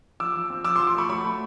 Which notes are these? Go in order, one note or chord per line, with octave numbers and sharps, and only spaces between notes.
F3 D6 E6
F3
C4
F3 D6 E6
C6 D6
F3
C6 D6
A3 B5 C#6
F#3 B5 C#6
A3